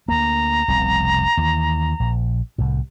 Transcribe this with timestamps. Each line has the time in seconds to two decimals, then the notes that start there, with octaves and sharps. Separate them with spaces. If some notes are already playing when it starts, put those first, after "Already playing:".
0.08 D2 A#3 A#5
0.68 F1 C2 B2
1.37 D#2 E3
2.00 A#1
2.58 C2 A2